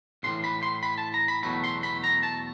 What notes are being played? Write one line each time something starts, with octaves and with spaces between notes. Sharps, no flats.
B1 A2 E3 C6
B5
C6
B5
A5
A#5
B5
E2 B2 F#3 A3 B5
C6
B5
A#5
A5